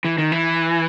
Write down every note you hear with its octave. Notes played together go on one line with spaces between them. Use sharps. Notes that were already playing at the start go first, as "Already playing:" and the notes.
E3
D#3
E3